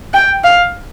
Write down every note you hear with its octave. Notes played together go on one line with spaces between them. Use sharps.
G5
F5